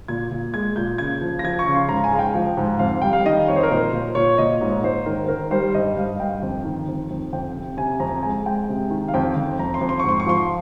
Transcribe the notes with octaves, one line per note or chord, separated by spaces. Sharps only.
A#2 G#6
A#2
G#3 G#6
A#2 G6
C#3 G#6
F3
A#6
F3 G#6
C#6
C#3
C6
G#2 A#5
G#5
G#3 F5
G5
F3
G#2
F2 F5
G3 G5
F5
D#3 D#5
F2 C#5
C5
A#4
A#2 C5
A#2
A#2 C#5
A#2 D#5
G#2 C#5
G#2 C5
D#3 A#4
C5
D#3 A#4
G3 C5
G2 D#5
G2 F5
G2 G5
F2
D#3
F2
F2
F2 G5
C3
C3 G#5
F2 A#5
G#3 G#5
G#3 G5
C3
D#3
F5
F2 G5
F2
F2 A#5
C6
F2
C6
G#2 C#6
C6
C#6
F3 C6